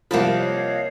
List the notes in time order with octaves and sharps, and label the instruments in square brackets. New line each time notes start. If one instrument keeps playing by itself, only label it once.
[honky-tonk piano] C2 F3 [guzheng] A#3 A5 B5
[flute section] C#5 D#5 F5